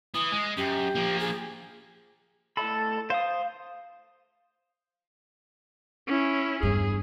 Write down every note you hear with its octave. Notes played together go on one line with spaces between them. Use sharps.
E3 D#6
G#3
F#2 G4
F3 A#3
G#4
A2 A4 D#5 B5
C5 F5 D#6
C#4 E4
E2 G2 G#4